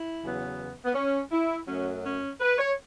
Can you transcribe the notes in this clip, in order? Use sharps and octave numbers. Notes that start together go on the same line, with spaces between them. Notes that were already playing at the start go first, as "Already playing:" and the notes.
Already playing: E4
E2 C#3 F#3 B3
B3
C#4
E4
F#2 F#3 A3 C#4
C#4
B4
C#5